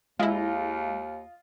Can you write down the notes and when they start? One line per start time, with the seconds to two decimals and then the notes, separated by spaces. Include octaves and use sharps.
0.19 D#2 G#3 E4 F4 D#5